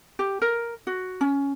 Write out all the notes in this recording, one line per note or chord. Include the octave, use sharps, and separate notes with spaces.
G4
A#4
F#4
C#4